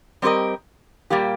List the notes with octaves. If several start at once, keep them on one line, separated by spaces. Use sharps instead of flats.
G3 C4 G4 A#4 D#5
A#2 G3 A#3 G4